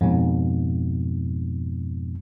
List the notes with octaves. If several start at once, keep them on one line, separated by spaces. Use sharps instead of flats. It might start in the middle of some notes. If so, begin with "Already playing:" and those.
F2 G#2 B2